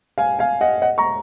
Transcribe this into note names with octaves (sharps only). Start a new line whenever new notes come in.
F5 G#5
F5 G#5
D#5 F#5
D#5 F#5
A#5 C#6